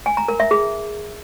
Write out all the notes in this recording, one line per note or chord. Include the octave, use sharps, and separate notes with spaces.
G#5
A#5
A#4
E5
G#4